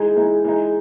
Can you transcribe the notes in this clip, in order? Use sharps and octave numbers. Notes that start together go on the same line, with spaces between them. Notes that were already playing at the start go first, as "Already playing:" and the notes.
Already playing: E3 G#3 D#4 G#4
E3 G#3 D#4
E3 G#3 D#4